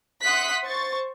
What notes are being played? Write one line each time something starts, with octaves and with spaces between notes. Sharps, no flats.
E5 F#5 C6 D#6 F#6 B6
C5 C#6 A6